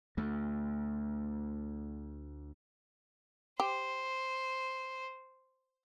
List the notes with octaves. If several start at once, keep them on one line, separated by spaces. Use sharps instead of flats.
D2 A3
G4 C5